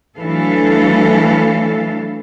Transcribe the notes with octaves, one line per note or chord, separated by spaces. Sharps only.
E3 F#3 A3 D4 A4 F5